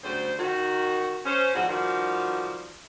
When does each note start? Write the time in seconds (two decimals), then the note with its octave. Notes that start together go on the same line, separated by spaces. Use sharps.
0.04 D2 C#3 G3 C5
0.38 D#3 F#4
1.25 C#4 C5
1.55 G#2 B2 F3 G3 F#4
1.69 D#3 F3 G3 A#3 F#4 B4